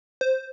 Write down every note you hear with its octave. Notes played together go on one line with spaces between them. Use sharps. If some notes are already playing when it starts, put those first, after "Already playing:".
C5